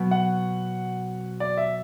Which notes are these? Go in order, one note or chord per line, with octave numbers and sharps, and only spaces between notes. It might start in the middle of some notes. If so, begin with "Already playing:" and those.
Already playing: B2 F#3 B3
F#5
D5
E5